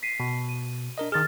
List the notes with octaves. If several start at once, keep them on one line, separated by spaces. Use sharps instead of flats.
B6 C7 D#7
B2
D#7
D4 A#4 D#5
D#3 G#4 F6 A6